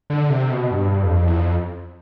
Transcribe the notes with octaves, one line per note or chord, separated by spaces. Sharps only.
D3
C3
B2
G2
F2
E2
F2